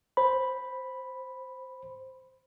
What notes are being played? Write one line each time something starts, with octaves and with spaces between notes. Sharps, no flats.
C5 B5